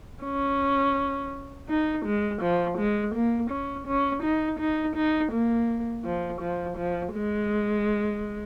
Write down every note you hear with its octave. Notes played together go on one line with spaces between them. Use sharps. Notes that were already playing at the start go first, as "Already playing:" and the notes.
C#4
D#4
G#3
F3
G#3
A#3
C#4
C#4
D#4
D#4
D#4
A#3
F3
F3
F3
G#3